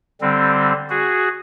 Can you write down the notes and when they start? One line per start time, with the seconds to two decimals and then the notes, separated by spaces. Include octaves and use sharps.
0.21 D3 G3 C4
0.90 F#4 G#4